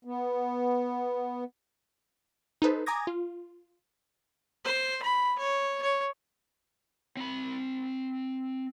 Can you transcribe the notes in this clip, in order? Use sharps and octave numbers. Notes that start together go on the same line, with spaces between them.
B3
D#4 A4 B4 C5
G#5 A#5 D6 D#6 G#6 A#6
F4
C5
B5
C#5
C#5
C4 B5